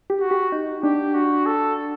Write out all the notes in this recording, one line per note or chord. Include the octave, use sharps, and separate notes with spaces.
G4
F#4
G4
D#4
D4 G4
F#4
A4